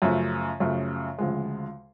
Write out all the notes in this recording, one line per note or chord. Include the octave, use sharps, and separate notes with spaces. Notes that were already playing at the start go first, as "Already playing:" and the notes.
F#2 C#3 F3 A3
F#2 C#3 F3 A3
D2 C#3 F3 G#3